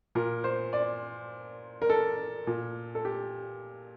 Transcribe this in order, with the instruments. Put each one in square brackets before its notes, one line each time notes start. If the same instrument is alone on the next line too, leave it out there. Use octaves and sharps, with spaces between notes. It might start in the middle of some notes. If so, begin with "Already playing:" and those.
[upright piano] A#2 A#4
C5
D5
A#4
A4
A#2
A4
G4